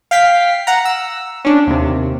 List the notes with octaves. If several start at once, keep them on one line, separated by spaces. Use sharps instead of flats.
F5 G5 B6 C7
F#5 A#5
E6
C#4 D4
D#2 C3